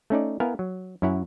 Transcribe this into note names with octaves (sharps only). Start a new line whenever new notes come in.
A3 C#4 D#4 D5
B3 E4 A#4 F5 G#5
F#3
F#2 C#4 E4 C#5 F#5